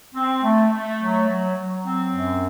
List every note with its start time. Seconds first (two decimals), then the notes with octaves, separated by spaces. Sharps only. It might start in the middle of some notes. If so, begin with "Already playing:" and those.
0.15 C4
0.43 A3
0.71 A3
1.00 F#3
1.28 F#3
1.57 F#3
1.85 C4
2.13 F#2